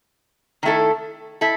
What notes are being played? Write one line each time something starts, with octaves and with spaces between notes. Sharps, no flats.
D#3 A3 E4 A4
E4 A4